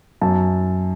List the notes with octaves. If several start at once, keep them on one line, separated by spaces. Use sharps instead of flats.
F#2 A5